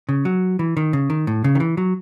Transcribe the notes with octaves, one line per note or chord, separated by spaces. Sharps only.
C#3
F#3
E3
D#3
C#3
D#3
A2
C#3
D#3
E3
F#3